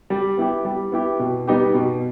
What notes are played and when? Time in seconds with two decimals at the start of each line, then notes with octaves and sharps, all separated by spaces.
0.10 G3
0.37 B3 E4 G4
0.65 G3
0.92 B3 E4 G4
1.19 B2
1.48 G3 B3 D#4 G4
1.74 B2